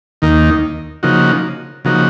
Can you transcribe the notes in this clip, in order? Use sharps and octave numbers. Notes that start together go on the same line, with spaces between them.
D#2 D#3 A#3 D#4
C#3 F3 A#3 D#4 F#4
C#3 F3 A#3 D#4 F#4